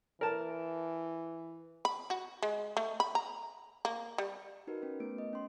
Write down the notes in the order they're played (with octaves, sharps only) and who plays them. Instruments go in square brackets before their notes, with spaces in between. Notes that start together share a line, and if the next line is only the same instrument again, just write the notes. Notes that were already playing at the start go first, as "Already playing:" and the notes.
[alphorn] E3 [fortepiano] A#4 A5
[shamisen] B5
F#4
G#3
A3
B5
A#5
A#3
G3
[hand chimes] D#4 F#4 A#4 B4
C#4 B4
A3 B3 D7
D#5
C#4 C6